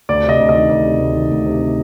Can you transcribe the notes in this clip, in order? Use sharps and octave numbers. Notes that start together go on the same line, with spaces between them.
D2 D5
C3
D#5
D2
D#5
D#3
D2 D5
C3
D2
D#3
D2
C3